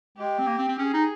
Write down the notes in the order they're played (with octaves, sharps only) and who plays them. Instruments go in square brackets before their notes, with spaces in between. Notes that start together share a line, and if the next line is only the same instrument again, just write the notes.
[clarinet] G#3 [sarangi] G4
[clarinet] C4
A#3
C4
C4
[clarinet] C#4 [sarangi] G#4
[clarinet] D#4